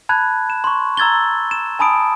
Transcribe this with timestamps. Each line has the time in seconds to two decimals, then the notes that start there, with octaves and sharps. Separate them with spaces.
0.09 A5 B5 F#6 G#6
0.50 E7
0.64 C6 C#6
0.97 A#5 E6 G#6 A6 G7
1.51 E7
1.79 G#5 A5 B5 D#6 D7